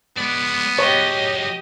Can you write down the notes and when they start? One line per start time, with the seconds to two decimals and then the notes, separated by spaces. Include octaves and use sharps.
0.18 G#3 B3 D5
0.79 F#3 G#3 G4 C#5 D#5